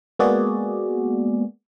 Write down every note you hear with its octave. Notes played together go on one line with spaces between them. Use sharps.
G#3 A#3 B3 F#4 G#4 D5